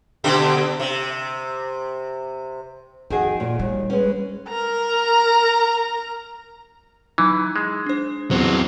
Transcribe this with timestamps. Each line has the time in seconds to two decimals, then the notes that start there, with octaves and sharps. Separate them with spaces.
0.24 B2 D3 G4
0.80 C3
3.10 F2 D#3 F#4 G#4
3.40 A#2
3.59 D#2 G3
3.90 G#3 C#4 B4
4.49 A#4 A#5
7.18 E3 F#3 D#4
7.56 G#3
7.86 D4 C5
8.31 E2 F#3 C4 C5